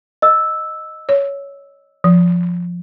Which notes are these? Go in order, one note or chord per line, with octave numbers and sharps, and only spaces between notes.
D#5 E6
C#5
F3